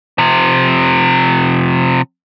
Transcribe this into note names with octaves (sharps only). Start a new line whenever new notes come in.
C3 F3